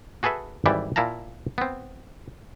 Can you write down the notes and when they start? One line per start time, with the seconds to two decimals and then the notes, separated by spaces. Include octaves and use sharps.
0.23 F#4 G#4 A4 B4 E5
0.66 G#1 E3 G3 E4 D5
0.96 A#2 E4 F5 A5 A#5
1.58 B3 C4